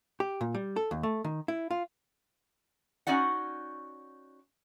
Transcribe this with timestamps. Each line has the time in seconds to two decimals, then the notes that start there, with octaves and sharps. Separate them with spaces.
0.20 G4
0.41 A#2
0.55 G3
0.76 A4
0.91 D#2
1.03 A3
1.24 D#3
1.48 E4
1.71 F4
3.07 C#4 D#4 F#4 D5 F#5